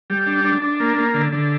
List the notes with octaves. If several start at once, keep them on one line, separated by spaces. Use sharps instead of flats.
G3
D4
D4
D4
A#3
A#3
D3
D3